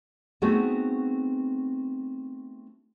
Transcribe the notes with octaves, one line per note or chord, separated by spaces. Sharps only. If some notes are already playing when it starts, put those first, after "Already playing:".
A3 B3 C4 D#4 F#4 G#4